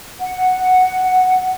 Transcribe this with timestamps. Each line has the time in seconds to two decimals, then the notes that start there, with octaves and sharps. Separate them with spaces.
0.20 F#5